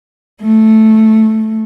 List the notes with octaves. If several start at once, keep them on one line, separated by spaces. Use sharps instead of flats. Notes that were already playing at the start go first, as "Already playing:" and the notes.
A3